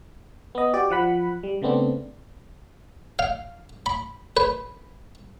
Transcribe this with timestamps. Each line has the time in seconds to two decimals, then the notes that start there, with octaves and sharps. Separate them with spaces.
0.55 B3 D#5
0.74 F#4 G4 D5
0.90 F3 F#5 B5
1.43 G3
1.62 C#3 A3 B3 C4 D4
3.19 F5
3.86 B5
4.37 B4